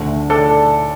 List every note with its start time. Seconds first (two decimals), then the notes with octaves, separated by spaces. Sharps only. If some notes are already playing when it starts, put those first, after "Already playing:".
Already playing: D2 D3 A3
0.30 A4 D5